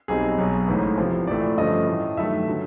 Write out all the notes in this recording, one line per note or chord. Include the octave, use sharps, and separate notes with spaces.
B1 B2 G3 C4 D#4 G#4
B1 B2 F#3
A1 G#2 E3 A3
E2 C3 F3
A#1 A2 E3 A3 D5
G2 D3 F3 A3 C#4 D#5
A2 E3 A3
G2 D#3 F#3 A3 E5
D3 F#3